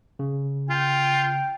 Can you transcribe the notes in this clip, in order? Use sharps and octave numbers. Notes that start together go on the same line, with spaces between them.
C#3
F4 G5